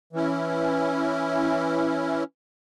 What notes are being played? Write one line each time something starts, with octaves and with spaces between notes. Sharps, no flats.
E3 C#4 E4